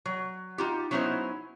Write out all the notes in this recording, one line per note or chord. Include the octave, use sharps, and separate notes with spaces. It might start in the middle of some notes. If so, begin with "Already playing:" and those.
F#3
D#4 F4 G4
F#3 B3 C#4 D#4 E4 C5